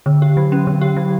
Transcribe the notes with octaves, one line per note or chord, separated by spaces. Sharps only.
D3
G4
F#3
C#4
D3
G4
F#3